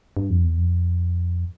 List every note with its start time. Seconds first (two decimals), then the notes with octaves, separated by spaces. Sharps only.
0.17 G2
0.30 F2
0.43 E2
0.58 F2